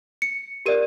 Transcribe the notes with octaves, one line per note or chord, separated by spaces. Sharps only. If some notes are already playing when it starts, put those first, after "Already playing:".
C#7
G4 A#4 D5 D#7